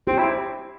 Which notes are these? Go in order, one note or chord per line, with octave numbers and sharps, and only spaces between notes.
C4 G4
E4